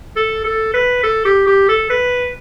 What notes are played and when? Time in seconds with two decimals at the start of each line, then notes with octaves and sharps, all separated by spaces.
0.17 A4
0.45 A4
0.74 B4
1.04 A4
1.25 G4
1.47 G4
1.69 A4
1.90 B4